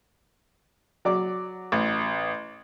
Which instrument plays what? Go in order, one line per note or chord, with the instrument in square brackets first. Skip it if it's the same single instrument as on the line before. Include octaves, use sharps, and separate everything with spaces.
[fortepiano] F#3 D5 D6
[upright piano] A1